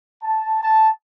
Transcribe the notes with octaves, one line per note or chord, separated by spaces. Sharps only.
A5
A5